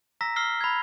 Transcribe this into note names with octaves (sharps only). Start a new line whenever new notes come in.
A#5 E6 A#6 B6
E6 F6 C7 G7
B5 G#6